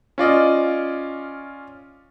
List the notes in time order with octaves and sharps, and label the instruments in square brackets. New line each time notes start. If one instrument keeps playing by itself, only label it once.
[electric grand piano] C#4 F4 D5 D#5